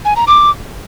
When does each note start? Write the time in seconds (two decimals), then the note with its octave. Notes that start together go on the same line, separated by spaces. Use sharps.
0.05 G#5
0.16 A#5
0.27 D6